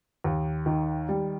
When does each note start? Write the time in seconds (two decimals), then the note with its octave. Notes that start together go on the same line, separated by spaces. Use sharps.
0.24 D#2
0.66 D#3
1.09 G3